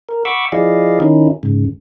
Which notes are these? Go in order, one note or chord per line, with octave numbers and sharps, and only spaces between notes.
A#4
F#5 B5 C#6 D6 E6
F3 E4 G#4 D5 D#5 F5
D#3 C#4 D#4 E4
G#2 C#3